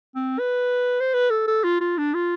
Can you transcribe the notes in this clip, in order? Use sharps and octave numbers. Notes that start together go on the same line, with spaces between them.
C4
B4
C5
B4
A4
A4
F4
F4
D4
F4